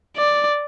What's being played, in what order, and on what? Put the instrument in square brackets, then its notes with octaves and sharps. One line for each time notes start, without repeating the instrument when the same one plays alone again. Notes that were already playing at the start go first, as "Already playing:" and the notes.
[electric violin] D5